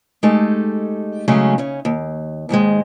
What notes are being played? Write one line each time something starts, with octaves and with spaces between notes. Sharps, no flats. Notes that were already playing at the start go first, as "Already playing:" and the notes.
G#3 A3 D#4 G4 A4
C#3 F#3 G#3 A3 C#4
C#3 C#4
D#2
D#2 G#2 D#3 G#3